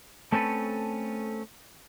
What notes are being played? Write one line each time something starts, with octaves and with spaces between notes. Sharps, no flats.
A3 C4 C#4 A4 B4